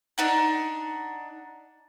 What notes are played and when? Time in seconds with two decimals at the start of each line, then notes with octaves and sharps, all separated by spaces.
0.18 D4 D#4 F#5